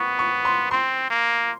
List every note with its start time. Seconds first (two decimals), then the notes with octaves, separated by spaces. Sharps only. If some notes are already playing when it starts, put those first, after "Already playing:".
Already playing: B3 C#6
0.19 C#6
0.45 C6
0.71 C4 C6
1.10 A#3